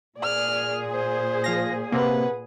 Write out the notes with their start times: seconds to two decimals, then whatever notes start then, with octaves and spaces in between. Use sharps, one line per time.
0.18 A#2 G#4 D5 F6
0.91 C5
1.44 F3 F5 A#6
1.92 C3 A#3 B4 F#5